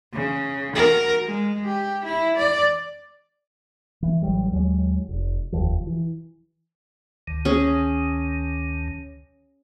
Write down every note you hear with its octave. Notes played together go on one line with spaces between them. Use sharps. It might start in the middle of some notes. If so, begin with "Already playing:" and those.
C#3
F#4 A#4
G#3
G4
E4
D5
E3
A1 F#3 G3
D#2 F#3 G#3
F1
F1 D#2 F3
E3
D2 D#3
C#4 G#4